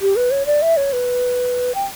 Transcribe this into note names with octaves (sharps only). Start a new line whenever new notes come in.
G4
B4
C#5
D5
E5
C#5
B4
G5